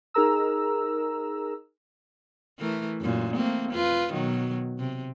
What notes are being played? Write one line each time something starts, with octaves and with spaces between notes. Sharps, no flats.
D#4 G#4 A#4 A#5 E6
E3 A3 A#4
F#2 A#2
A3 A#3 C4
F2 F4 B4
B2 D#3 F#3
C3